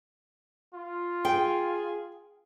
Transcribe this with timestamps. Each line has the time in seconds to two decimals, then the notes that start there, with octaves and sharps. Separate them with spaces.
0.74 F4
1.25 G#4 G5